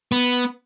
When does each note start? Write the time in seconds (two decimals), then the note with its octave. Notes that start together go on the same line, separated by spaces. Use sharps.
0.12 B3